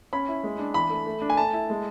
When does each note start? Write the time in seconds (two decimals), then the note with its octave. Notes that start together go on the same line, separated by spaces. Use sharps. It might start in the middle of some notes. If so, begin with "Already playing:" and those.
0.13 C#4 B5
0.28 E4
0.44 G#3
0.59 D4
0.74 E3 B5
0.90 A3
1.07 A3
1.22 D4
1.30 G#5
1.37 A3 A5
1.53 E4
1.70 G#3